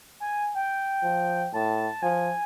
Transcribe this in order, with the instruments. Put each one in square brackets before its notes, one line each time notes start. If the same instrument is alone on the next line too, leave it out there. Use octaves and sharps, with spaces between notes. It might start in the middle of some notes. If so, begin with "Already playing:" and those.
[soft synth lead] G#5
G5
[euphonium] F3
[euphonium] A2 [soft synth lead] A5
[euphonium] F3 [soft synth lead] G#5